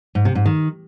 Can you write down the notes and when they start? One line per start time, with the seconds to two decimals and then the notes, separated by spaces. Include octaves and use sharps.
0.15 G#2
0.25 C3
0.35 G#2
0.46 D#3